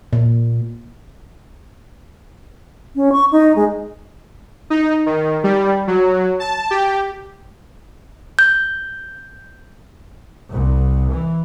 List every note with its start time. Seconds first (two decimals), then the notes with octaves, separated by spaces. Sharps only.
0.13 A#2
2.96 C#4
3.12 C#6
3.32 D#4
3.56 G#3
4.70 D#4
5.06 D#3
5.44 G3
5.87 F#3
6.40 A5
6.71 G4
8.39 G6
10.50 C2
11.11 E3